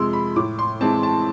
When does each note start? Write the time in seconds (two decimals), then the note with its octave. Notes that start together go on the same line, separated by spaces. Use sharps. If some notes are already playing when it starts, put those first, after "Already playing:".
Already playing: F2 C3 F3 G#3 C6 E6
0.13 B5
0.36 A2 D6
0.59 C6
0.81 E3 G#3 C4 A5
1.03 A5